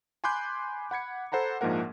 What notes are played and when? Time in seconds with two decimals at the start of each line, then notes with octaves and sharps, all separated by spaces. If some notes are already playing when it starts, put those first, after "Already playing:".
0.24 G#5 B5 C6 D6 F#6 G6
0.91 F#5 B5 G#6 C#7
1.32 A4 C5 F#5 A#5 B5
1.61 A#1 G#2 F3 A#3 A#4 F#5